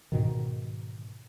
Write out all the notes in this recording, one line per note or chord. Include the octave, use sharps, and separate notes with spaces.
G#2 B2 D#3